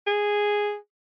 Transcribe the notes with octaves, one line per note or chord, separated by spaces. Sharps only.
G#4